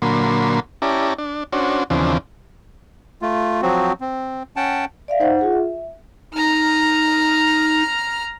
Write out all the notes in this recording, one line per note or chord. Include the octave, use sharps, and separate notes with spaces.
A#2 D3 F#3 A#3 B5 C6
C#4 E4 G4 D5 A5 A#5
D4
C#4 D4 F#4 C5
D#2 C#3 E3 F3 C4 D4
A3 F4
F3 F#3 C4 F#4
C4
C#4 F#5 G5 A5
D5 E5 F5
D#4 C5 F#5
F4 G#4 F#5
E5
D#4 A#5 F6